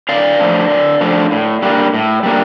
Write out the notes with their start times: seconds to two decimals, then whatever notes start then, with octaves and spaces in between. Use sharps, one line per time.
0.09 D3 D5 F5
0.40 F3 A3 D4
0.70 D3
1.01 F3 A3 D4
1.31 A2
1.62 G3 A#3 D4
1.94 A2
2.23 G3 A#3 D4